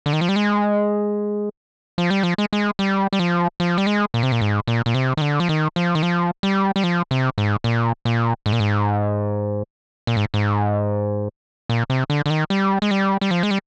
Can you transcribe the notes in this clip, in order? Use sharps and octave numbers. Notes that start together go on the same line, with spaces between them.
D3
D#3
F3
G3
G#3
F3
G3
F3
G#3
G#3
G3
G3
F3
F3
G3
G#3
A#2
C3
A#2
G#2
A#2
A#2
C3
D#3
D3
F3
D#3
F3
D#3
F3
G3
G3
F3
C3
G#2
A#2
A#2
G#2
A#2
G#2
A#2
G#2
G#2
A#2
C3
D3
D3
D#3
G3
G#3
G3
G3
F3
G#3
G3